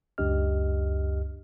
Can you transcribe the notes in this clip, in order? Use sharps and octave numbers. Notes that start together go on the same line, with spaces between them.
C#2 F#2 D4 G4 D#5 F6